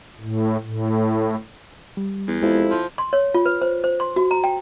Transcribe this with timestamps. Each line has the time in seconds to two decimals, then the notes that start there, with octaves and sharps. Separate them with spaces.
0.19 A2
0.62 A2
1.97 G3
2.28 E2
2.42 F2 G#3 E4 G4
2.71 F3
2.98 C6
3.13 C#5
3.34 F4
3.46 B4
3.62 C5
3.84 C5
4.00 C6
4.16 F#4
4.31 A#5
4.44 G5